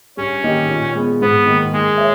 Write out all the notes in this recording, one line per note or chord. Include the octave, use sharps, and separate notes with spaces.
G2 C#4
D#3 A#3 D#4 G4
A#2
G#3 B3
G#2 B3
D#3 A#3
G#3 A#3
C#5 E5